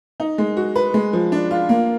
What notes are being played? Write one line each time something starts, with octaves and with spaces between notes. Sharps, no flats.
D#4
G#3
F#4
B4
G#3
F3
D4
F4
A#3